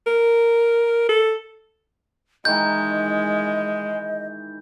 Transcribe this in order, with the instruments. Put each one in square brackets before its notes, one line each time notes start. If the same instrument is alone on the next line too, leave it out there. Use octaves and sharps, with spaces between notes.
[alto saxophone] A#4
A4
[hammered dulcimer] D#3 E3 [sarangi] G#3 [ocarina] D#5 [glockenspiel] G6